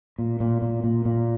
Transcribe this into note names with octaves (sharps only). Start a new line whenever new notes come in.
A#2
A#2
A#2
A#2
A#2